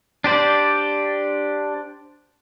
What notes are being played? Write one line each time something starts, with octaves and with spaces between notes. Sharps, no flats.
D4 G4 C5 D5